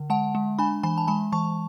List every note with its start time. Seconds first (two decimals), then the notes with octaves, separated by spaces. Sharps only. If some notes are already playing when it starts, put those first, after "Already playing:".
Already playing: D3
0.10 G#3 F#5 A5
0.35 G#3
0.59 D4 G#5 B5
0.83 E3 G#5 B5
0.98 A5
1.08 G#3 G#5 B5
1.32 E3 A5 C#6